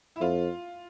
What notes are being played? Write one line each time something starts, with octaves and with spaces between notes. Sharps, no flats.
E4
F2 F4